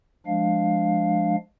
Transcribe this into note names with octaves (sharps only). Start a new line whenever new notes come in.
F3 G#3 D4 F5